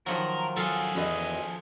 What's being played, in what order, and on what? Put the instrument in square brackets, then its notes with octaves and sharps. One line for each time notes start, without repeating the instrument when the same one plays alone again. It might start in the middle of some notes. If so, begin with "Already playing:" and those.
[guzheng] D#3 F3 F#3 [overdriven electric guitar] A#4
[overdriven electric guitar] F3 G#4 [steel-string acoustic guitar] F#3 F4 [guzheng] A4 F5
[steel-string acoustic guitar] E2 F#4 D#5